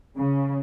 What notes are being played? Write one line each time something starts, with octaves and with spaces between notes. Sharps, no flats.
C#3